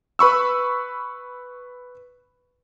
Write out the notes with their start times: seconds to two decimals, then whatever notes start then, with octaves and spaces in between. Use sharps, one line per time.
0.19 B4 B5 C#6 E6